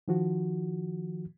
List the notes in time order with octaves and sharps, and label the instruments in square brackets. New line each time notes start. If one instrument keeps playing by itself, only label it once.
[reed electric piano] D#3 F3 F#4